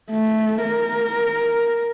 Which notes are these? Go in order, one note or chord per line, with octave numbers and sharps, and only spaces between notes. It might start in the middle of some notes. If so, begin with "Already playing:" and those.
A3
A#4